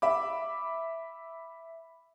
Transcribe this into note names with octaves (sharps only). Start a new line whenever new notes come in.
E5 B5 D6